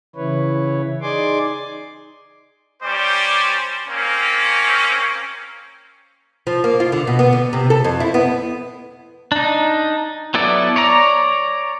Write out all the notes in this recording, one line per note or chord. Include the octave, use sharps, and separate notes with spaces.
C#3 E3 E4 B4 C#5
D#4 G#4 D5 G#5 C6 D6
G3 C#4 C5 D5 D6
A#3 C4 C#4
F3
A#3
F4
D3
B2
B3
D3
C3
A4
F2
E4
B3
D4 D#4
F#3 B3 E4 A4 D5
C#5 D5 A#5